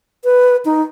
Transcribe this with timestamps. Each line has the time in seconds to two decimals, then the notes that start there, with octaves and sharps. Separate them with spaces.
0.24 B4
0.65 D#4